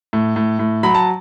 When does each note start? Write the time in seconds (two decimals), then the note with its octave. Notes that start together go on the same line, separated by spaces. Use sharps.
0.13 A2
0.36 A2
0.59 A2
0.83 F#3 B5
0.95 A5